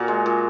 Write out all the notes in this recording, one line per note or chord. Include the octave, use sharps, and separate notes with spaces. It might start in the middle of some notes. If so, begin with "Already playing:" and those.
Already playing: A#2 F#4 G#4 A#4
G#3
A#2